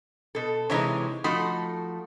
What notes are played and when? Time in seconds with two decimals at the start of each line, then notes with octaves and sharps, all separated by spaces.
0.35 B2 A4
0.70 C3 E3 G#3 D#4 E4 C#5
1.24 F3 A3 D#4 F#4 B5 C6